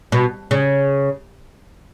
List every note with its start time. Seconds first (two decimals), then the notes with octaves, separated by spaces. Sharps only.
0.12 B2
0.51 C#3